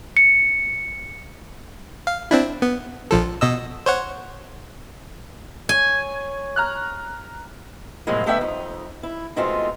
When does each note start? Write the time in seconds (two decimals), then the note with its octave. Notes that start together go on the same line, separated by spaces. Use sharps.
0.17 C#7
2.07 F5
2.31 C4 D4 E4
2.62 B3
3.11 A#1 F3 A4
3.41 B2 D#5 E6
3.86 C5 C#5 F#5
5.69 C#5 G#5
6.56 A#5 F6 F#6
8.07 A2 C3 F3 F#3 G#3 A#3
8.26 D3 A3 B3 B4 E5 G5
8.41 F2 D#4
9.03 E4
9.36 B2 G#3 A3 C4 D#4 F4